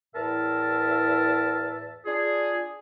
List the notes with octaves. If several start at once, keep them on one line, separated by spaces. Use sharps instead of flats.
E2 A2 A#4 E5 A5
D4 F4 G#4